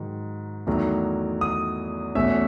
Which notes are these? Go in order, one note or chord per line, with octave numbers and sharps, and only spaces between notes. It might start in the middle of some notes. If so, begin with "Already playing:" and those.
Already playing: G#2 D#3 F#3
E2 D#3 F#3 A3
D#6
E2 B2 A3 C#4 E5